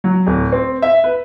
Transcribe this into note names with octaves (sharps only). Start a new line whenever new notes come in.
F#3
D1
C4
E5
B4